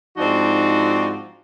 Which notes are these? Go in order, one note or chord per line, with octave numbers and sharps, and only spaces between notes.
G#2 F3 C4 D4 D#4 F#4